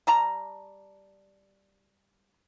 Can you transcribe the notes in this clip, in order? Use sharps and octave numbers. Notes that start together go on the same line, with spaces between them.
G3 A5 A#5